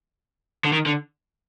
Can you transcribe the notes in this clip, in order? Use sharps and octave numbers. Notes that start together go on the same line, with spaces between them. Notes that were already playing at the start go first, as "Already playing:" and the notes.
D3
D#3
D3